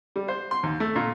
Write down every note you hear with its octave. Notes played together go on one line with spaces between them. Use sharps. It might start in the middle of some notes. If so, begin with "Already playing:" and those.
G3
C5
C6
D#2
A3
A#2